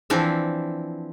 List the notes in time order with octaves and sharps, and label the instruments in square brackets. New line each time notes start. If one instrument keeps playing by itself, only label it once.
[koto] E3 F3 C4 D4 E4